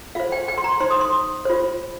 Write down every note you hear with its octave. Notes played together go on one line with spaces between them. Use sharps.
F4 C5 F5
G5
G5
C6
A#5
D#4 C5 C6
D#6
C6
F4 C5